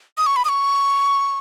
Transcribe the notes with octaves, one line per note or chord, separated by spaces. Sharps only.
D#6
C#6
B5
D#6
C#6